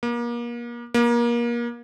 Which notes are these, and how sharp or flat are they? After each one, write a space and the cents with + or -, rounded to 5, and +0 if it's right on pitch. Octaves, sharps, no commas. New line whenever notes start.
A#3 +35
A#3 +30